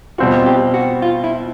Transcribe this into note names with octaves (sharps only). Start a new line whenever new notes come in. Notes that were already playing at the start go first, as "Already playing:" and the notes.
B2 G3 C4 F4 F#4
G4
F#4
F4
E4